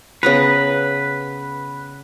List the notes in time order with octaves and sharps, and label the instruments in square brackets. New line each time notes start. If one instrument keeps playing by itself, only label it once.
[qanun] C#3 B3 A#5 [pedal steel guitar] B4